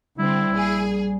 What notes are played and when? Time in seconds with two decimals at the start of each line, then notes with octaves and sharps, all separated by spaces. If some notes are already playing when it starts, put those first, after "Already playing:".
0.19 D3 G3 C4 E4
0.52 A#1 G#4